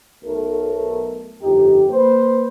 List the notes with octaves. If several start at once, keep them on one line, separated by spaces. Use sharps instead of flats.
B1 A3 A#4
G1 F2 D#4 G4
A#3 B4 C5